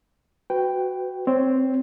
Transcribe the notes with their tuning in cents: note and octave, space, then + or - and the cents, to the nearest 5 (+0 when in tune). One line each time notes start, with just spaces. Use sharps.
F#4 +0 B4 +25 G5 +0
C4 +0 C#5 +15